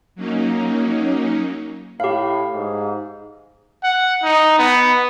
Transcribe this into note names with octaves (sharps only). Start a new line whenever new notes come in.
F#3 A#3 C#4 D#4
A2 G4 F5
G#2
F#5
D#4
B3